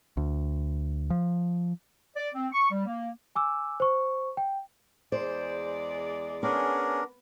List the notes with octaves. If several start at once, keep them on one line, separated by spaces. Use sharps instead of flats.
D2
F3
D5
C4
C#6
G3
A#3
G#5 D6 E6
C5 C#6
G5
E2 G#3 C5 D5
B3 C#4 D4 G#4 A#4